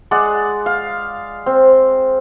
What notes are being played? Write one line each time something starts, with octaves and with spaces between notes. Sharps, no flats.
G#3 D5 F#5
F5
C4